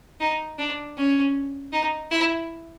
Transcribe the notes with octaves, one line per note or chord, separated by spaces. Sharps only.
D#4
D4
C#4
D#4
E4